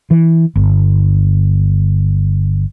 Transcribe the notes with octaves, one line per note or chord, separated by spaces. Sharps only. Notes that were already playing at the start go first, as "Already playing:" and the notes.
E3
G1